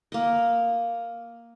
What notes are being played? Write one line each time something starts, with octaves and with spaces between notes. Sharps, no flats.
A#3 D#5